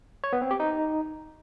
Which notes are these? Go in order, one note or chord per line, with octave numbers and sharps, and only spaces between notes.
C#5
B3
C4
G4
D#4